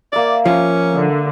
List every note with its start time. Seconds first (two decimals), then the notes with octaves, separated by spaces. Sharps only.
0.13 A#3 D5 E5
0.46 F3 C#4 F4
0.93 D3